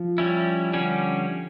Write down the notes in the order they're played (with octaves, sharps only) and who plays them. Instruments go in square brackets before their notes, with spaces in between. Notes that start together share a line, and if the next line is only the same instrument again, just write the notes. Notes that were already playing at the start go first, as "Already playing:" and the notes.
Already playing: [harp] F3
[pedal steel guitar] G3 C#4 E4
D3 G3 C#4